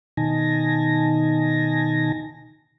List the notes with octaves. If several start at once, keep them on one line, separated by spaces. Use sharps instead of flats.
B2 D#3 D#4 G#5 A5 A#6